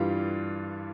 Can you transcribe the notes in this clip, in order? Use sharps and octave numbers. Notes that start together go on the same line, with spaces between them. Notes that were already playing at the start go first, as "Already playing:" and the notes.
Already playing: G2 E3 G3 F4